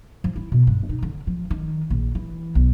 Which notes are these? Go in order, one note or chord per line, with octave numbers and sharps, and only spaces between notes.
F3
E4
B2
G2
D#4
D3
F3
D#3
A#1
E3
B1